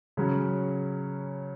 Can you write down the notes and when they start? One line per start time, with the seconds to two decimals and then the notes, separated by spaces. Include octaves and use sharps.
0.17 C#3 F#3 C#4